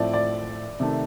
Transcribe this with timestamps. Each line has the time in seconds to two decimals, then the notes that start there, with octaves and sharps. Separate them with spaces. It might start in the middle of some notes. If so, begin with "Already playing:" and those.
Already playing: A2 F3 A3 C4 D5
0.13 D5
0.80 C3 D#3 A3